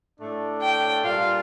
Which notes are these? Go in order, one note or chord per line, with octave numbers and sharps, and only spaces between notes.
A2 A3 D4
G5
A#2 G3 D4 F4 F5